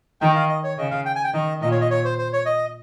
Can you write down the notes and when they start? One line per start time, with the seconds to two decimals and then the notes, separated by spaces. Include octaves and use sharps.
0.21 D#3 G5
0.35 F5
0.49 D#5
0.63 C#5
0.78 C#3 D#5
0.91 F5
1.05 G5
1.15 G#5
1.24 G5
1.34 D#3 D#5
1.61 A#2 D#5
1.71 C#5
1.81 D#5
1.90 C#5
2.05 C5
2.18 C5
2.33 C#5
2.46 D#5